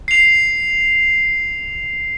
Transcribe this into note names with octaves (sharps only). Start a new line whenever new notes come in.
C7 F7